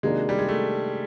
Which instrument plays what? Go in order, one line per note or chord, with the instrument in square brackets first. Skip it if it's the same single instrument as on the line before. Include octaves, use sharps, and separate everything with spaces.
[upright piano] C3 D#3 F#3 A#3 D4 [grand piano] G#3
[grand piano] G3
G#3
A3